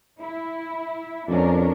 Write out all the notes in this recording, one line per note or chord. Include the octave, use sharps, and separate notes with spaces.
E4
F2 C#4 D4 A#4